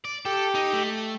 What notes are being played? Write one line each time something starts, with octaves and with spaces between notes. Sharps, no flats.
D5
G4 A4
D#4
A3